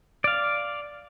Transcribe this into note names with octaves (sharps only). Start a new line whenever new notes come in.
D5 F5